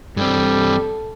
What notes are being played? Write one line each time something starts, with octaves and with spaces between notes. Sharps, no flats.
G2 G3 C4 A4